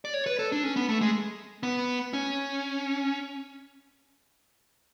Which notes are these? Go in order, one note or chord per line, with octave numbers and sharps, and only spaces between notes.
D5
C#5
B4
A4
D4
C#4
B3
A3
G#3
B3
C#4